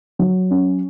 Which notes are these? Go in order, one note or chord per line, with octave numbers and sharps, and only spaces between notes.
F#3
C#4